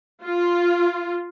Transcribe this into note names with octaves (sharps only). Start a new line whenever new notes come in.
F4